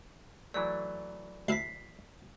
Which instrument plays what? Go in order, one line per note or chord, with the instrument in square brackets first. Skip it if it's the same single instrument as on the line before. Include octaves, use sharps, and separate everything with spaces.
[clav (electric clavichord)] E3 F#3 A3 [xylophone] D5
[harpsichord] D2 E4 F5 [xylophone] B6 C7